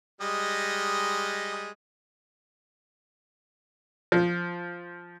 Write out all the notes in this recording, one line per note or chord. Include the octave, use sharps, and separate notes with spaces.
G3 G#3 D#5
F3